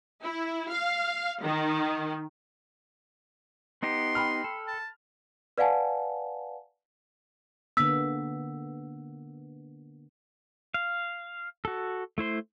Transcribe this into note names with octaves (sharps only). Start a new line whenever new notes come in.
E4
F5
D#3
B3 D#4 G4 C6
G5 B5 F6
A4
A5
B4 D5 F5 F#5 G#5 A5
D3 A#3 B3 E6 B6
F5
F#4 A4
A3 E4 C5 C6